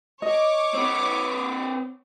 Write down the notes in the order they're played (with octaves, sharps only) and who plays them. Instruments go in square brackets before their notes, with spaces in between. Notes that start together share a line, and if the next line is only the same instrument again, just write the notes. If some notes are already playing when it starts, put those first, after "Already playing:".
[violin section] C#5 D6 [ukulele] D#5
[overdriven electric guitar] C4 B4